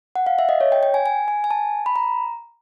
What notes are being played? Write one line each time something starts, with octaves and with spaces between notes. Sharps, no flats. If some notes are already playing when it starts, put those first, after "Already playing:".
F#5
F5
E5
D#5
C#5
G5
G5
G#5
G#5
G#5
G#5
A5
B5
A#5